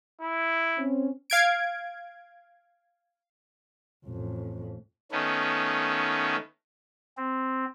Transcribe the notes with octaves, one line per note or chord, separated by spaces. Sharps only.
E4
C4 C#4
F5 G#6 D7
A1 F2
D#3 A3 B3 C#4
C4